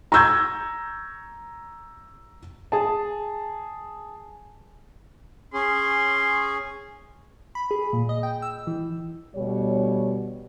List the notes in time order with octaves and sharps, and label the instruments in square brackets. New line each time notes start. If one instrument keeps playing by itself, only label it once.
[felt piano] A#5 C#6 E6 G6 G#6
[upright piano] G#4 A5
[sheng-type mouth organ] C#4 G#4 [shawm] C6
[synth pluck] B5
G#4
A#2
D#5
G5
E6
E3
[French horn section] D2 B2 G3 C#5